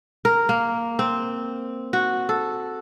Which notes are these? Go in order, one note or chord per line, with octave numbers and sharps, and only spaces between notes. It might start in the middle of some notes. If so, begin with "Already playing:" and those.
A#4
A#3
C4
F#4
A4